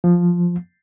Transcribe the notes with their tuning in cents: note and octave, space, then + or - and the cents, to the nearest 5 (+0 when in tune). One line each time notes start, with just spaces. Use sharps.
F3 +0